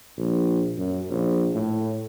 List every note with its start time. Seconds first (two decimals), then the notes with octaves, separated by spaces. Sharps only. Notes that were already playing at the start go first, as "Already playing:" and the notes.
0.18 A#1
0.77 F#2
1.10 A#1
1.53 A2